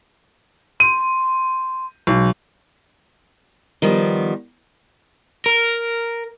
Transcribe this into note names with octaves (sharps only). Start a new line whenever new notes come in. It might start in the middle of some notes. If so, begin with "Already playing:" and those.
C6 D#7
B1 G#3
D#3 F3 G3 B3
A#4